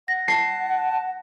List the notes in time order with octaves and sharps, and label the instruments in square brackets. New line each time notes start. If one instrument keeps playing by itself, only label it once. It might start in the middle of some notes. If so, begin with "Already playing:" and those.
[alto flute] F#5 [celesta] A#6
[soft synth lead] A5 [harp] C7